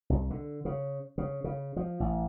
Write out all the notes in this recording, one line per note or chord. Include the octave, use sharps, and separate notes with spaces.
C2
D3
C#3
C#3
C#3
F3
A1